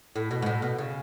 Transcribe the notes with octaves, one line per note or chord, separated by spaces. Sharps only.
A2
B2
G#2
A2
B2
C#3